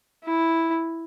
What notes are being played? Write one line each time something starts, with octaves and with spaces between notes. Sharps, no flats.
E4